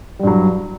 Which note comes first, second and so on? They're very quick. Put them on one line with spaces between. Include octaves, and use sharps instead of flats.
G3 G2 F#3